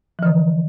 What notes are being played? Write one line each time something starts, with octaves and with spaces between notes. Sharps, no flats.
D3 E3 F3